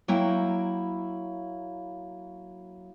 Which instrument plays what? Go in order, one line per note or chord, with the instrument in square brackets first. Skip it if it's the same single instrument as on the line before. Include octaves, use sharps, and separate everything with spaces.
[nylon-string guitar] F#3 A#3 E4 E5 G5